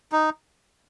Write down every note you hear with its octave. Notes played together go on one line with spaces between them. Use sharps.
D#4